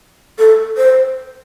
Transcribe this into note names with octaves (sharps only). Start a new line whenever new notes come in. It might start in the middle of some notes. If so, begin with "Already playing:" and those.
A4
C5